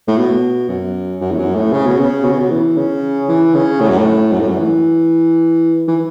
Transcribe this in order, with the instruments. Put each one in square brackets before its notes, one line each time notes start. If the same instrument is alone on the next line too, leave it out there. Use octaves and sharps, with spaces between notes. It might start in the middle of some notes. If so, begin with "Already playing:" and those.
[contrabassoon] A2
B2
F#2
F#2
E2
F#2
A2
C#3
B2
C#3
B2
C#3
B2
E3
C#3
E3
C#3
A2
F#2
A2
F#2
A2
F#2
E3
E3